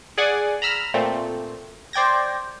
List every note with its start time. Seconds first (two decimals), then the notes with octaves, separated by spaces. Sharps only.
0.18 G#4 D5 F#5 G#5
0.62 A#5 B5 E6 F6
0.94 A#2 A3 C4
1.93 C5 D5 G5 G#6 A#6